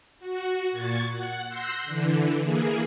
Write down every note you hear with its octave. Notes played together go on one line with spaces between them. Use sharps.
F#4
A#2 C#6 G#6 A6
F#5
C6 E6 F#6 G6 A#6 C7
D3 E3
E3 A#3 G#4